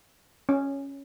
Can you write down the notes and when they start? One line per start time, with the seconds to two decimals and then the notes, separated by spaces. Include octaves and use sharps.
0.49 C#4